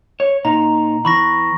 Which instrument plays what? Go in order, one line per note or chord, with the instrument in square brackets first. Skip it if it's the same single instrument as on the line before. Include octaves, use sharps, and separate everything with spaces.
[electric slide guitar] C#5
[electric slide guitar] A#2 D#4 [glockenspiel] A#5
[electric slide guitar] E2 E3 [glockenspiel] B5 C#6 A#6